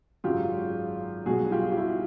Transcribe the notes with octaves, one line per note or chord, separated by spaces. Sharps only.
G#1 F#2 C#3 F#3 F4 G4
B1 B2 G3 F#4 G#4
F4 G4
G4
E4 F#4